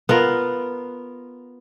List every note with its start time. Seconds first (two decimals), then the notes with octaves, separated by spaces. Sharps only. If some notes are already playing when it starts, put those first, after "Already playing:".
0.09 B3 F4 A#4